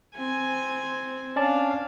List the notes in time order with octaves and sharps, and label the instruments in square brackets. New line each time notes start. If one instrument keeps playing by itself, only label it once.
[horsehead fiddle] C4 [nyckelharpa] G#5
[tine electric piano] C#4 D5 A5 [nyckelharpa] D4 F5